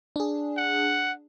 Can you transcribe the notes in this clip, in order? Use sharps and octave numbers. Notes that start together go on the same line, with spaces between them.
D4 G#4
F#5